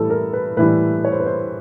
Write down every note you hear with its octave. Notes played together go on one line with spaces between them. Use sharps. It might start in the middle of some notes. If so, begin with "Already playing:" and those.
Already playing: A2 E3 G3 A4
A#4
B4
A2 E3 G3 B4
C#5
C5
B4
C5